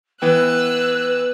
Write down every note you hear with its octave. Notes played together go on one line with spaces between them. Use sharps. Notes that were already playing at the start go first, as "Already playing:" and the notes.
E3 B3 B4 G5 E6 F#6